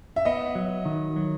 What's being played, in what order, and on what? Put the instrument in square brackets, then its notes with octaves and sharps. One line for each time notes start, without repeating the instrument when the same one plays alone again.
[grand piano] E5
[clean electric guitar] B3 [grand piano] D#5
[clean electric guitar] F#3
D#3
F#3